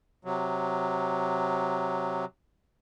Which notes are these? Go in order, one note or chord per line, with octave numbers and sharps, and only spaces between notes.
C3 F#3